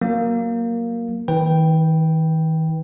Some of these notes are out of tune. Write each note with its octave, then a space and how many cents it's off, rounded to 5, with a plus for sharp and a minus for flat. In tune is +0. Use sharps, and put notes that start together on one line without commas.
F#3 +0 A#3 +0
D#3 +45 B4 -5 G5 +0